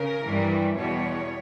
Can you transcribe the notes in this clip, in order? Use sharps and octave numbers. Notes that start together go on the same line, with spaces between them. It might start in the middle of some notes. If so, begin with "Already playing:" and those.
Already playing: C#3 A#4
G2 E3 G3
E2 B2 G3 C#5